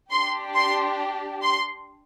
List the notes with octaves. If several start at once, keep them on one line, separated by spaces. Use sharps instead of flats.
D4 G4 C6
C6
C6